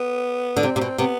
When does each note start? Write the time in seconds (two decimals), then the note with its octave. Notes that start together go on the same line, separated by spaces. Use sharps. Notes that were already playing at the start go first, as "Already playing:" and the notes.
Already playing: B3
0.57 D3
0.63 C3 C4
0.76 C3
0.81 B2
0.98 C3 B3